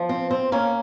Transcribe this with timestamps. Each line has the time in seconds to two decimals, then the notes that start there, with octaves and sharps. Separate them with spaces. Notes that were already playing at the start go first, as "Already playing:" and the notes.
Already playing: F3
0.09 C4
0.31 C4
0.52 A#3 C#4